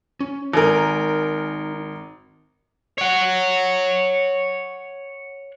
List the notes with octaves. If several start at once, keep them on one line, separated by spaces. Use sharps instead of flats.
C#4
G#1 D#4 A#4 G#5
C#5 F#5